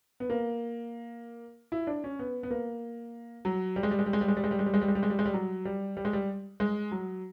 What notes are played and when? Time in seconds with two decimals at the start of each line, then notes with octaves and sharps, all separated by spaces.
0.20 B3
0.30 A#3
1.72 E4
1.87 D4
2.04 C#4
2.19 B3
2.43 B3
2.50 A#3
3.45 F#3
3.76 G3
3.83 G#3
3.91 G3
3.99 G#3
4.06 G3
4.13 G#3
4.21 G3
4.28 G#3
4.37 G3
4.44 G#3
4.51 G3
4.59 G#3
4.66 G3
4.74 G#3
4.81 G3
4.88 G#3
4.95 G3
5.03 G#3
5.10 G3
5.19 G#3
5.26 G3
5.34 F#3
5.65 G3
5.97 G3
6.05 G#3
6.13 G3
6.60 G#3
6.92 F#3